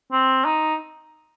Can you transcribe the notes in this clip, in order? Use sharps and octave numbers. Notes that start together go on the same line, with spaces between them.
C4
D#4